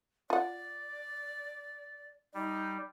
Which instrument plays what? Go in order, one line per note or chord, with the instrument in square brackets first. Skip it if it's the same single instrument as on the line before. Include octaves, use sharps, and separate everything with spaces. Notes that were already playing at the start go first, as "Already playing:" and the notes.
[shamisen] F4 F#5 [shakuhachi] D5
[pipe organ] G3 [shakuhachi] D#4